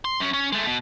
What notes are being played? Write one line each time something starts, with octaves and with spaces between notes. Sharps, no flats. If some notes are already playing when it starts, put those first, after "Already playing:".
C6
F#2 C#4
C#4
G#3 A3
B2